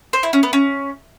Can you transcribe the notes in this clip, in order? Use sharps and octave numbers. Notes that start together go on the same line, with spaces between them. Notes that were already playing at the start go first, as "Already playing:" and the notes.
C5
E4
C#4
B3
C#4